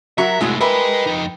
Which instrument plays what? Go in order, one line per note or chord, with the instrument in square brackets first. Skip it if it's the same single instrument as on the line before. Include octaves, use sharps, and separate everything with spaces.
[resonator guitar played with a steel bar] F#3 F#4 A#4 [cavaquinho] E4 A#5 C#6 [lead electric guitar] E5
[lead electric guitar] C2 A2 [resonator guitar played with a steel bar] G#3 E4 F#4 [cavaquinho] C#5 D#5 E5
[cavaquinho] E4 G4 B5 [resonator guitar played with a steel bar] A#4 [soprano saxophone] B4 [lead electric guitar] D#5 G#5
[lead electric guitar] F2 D#4